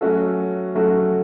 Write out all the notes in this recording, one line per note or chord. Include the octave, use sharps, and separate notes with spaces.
F#3 A3 C#4 F#4 A4
F#3 A3 C#4 F#4 A4